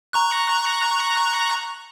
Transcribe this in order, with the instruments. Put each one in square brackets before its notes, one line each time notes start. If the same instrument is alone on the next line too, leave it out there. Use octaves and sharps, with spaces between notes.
[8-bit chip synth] A#5 C#6 F#6